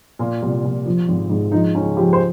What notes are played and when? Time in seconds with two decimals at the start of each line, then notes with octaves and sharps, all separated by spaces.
0.19 A#2 F4
0.42 C2
0.64 A#2
0.86 F3
1.08 G#1
1.30 G#2
1.52 F3 D#4
1.75 C#2 C#4
1.97 F3 G4
2.13 C5